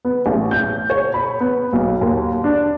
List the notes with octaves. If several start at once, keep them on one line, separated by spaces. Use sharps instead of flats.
B3
A1
G6
C#5
B5
B3
B1
D#2
D4